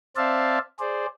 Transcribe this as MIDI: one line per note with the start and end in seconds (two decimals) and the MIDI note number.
0.16 0.58 60
0.16 0.58 72
0.16 0.58 74
0.16 0.58 76
0.16 0.58 77
0.16 0.58 81
0.80 1.06 68
0.80 1.06 72
0.80 1.06 74